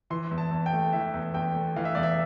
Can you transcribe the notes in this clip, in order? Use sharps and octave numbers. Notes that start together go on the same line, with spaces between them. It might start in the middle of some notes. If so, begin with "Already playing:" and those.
E3 C6
E2
A5
E2
G5
A3
E3 E5
E2
E2 G5
A3
E3 F5
E5
E2 D5
E5